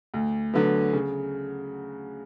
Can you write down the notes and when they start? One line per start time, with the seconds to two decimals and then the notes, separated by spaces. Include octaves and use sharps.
0.14 D2
0.54 D3 F#3 B3
0.93 C#3